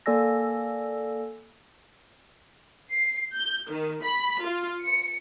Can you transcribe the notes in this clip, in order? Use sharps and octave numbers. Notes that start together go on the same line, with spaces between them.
A#3 A4 D5 G#5 E6 A#6
C7
G6
D#3
B5
F4
C#7